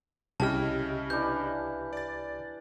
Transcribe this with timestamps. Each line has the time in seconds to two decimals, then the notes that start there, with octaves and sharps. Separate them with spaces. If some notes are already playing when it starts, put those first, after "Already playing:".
0.40 C2 C#3 E4 G4 D#5 A5 F6
1.10 E3 D4 G6
1.93 D5 A6